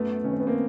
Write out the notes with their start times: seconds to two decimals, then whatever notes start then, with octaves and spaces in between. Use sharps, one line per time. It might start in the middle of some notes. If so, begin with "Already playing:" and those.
Already playing: F#2 A3 B3
0.24 D#3 C#4
0.31 C4
0.40 B3
0.47 A#3 C4